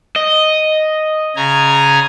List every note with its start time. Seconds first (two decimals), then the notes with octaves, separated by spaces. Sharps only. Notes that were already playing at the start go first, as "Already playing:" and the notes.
0.16 D#5
1.36 C#3 G#5 A#5